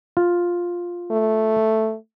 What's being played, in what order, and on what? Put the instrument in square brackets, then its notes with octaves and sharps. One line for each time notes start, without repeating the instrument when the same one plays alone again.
[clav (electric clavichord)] F4
[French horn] A3